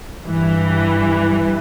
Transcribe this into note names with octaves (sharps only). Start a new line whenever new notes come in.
G2 E3 G3